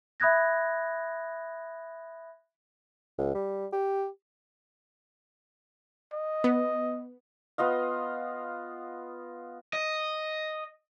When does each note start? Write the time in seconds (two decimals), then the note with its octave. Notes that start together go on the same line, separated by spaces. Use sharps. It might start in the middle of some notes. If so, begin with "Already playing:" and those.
0.20 E5 B5 D#6 F#6 G#6 A#6
3.19 C#2
3.35 G3
3.73 G4
6.13 D#5
6.44 B3
7.58 B3 F4 D#5 F5
9.73 D#5